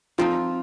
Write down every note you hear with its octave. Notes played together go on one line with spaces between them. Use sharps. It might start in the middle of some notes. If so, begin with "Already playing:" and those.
F3 C4 D#4 F4